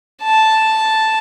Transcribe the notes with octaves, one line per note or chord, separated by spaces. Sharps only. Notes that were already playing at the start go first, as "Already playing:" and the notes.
A5